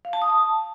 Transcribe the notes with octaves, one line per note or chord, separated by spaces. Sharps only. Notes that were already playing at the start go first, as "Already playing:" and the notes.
F5
A5
D#6
A5